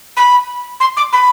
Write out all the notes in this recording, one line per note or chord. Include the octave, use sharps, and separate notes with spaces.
B5
C6
D6
B5